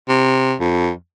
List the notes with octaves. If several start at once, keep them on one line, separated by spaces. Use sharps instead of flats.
C3
F2